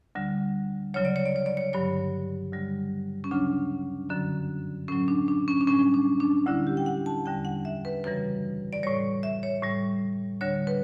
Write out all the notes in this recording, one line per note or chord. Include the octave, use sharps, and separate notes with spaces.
D2 D3 G3
D2 C#3 F#3 C#5
D5
C#5
D5
C#5
D5
C#5
G2 D3 F#3 C#5
D2 D3 G3
C#4
D2 C#3 F#3 D4
F#2 D3 F#3
A2 F#3 C#4
D4
D4
C#4
D4
A2 G3 C#4
D4
D4
D2 D3 G3 E4
G4
G5
F#5
A5
E2 D3 G3 G5
F#5
E5
B4
F#2 C#3 E3 G3 B4
D5
A2 G3 C#5
E5
C#5
A2 G3
D2 D3 G3 C#5
B4